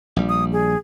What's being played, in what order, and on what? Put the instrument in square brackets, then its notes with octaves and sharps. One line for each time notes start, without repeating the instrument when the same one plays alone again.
[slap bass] A#1 G3
[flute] D#6
G#4